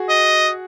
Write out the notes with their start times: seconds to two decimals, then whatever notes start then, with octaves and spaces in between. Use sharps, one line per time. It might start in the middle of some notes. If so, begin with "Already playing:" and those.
Already playing: F#4 G#4
0.09 D#5